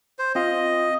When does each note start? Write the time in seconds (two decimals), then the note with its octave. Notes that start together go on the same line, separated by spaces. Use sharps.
0.19 C5
0.35 C4 F4 D#5 F5